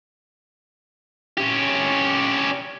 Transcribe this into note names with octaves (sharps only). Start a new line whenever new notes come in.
C#4 G4